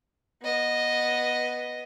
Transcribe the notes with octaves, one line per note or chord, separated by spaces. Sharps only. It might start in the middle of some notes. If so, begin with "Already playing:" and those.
B3 D#5